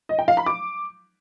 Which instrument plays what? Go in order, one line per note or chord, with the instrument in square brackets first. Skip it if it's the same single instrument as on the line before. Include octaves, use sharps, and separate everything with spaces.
[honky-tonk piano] D#5
G5
F5
B5
D6